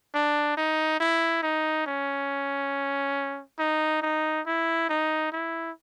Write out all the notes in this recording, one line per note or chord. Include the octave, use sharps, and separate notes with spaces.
D4
D#4
E4
D#4
C#4
D#4
D#4
E4
D#4
E4